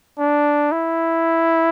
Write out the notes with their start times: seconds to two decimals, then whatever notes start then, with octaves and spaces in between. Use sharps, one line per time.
0.19 D4
0.72 E4